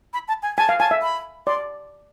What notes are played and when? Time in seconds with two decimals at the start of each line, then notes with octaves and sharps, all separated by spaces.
0.14 B5
0.28 A5
0.43 G#5
0.58 G#5 A5
0.69 F5
0.80 G#5 A5
0.91 E5
1.02 B5
1.47 D5 C6